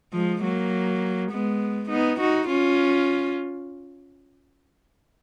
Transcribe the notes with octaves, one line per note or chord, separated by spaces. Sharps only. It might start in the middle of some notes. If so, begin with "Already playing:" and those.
F3 G#3
F#3 A#3
G#3 B3
B3 D#4
D#4 F#4
C#4 F4